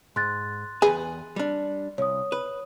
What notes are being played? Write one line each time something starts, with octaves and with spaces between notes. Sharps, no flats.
G#2 C6 F#6 A6
E2 G#4 B4
G3 D4
C2 C#5 D#6
B4